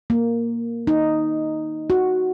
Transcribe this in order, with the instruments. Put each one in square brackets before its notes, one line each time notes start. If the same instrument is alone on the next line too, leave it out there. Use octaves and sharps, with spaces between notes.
[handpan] A#3
D#4
F#4